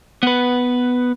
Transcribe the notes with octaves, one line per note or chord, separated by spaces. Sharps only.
B3 B4